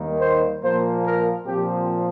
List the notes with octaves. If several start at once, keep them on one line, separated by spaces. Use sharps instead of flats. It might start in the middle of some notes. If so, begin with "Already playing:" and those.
Already playing: D#2 D#3 G3 A#3
C5
A#2 F3 A#3 C5
A#4
A#2 F3 C4 G4